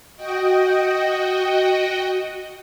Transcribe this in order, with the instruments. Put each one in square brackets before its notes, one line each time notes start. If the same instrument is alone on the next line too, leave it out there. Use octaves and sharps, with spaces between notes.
[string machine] F#4 D#5 G5